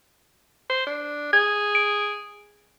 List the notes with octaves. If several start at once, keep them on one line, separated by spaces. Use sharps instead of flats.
C5
D4
G#4 G#6
D7